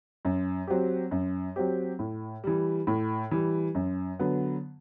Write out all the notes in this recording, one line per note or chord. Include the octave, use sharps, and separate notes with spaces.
F#2
F#3 C4 G4
F#2
F#3 C4 G4
A2
E3 G3
A2
E3 G3
F#2
D3 F#3 B3